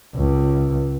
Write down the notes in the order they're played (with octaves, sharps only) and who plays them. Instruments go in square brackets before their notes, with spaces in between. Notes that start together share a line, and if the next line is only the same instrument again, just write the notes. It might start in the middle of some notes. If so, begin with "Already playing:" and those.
[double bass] C#2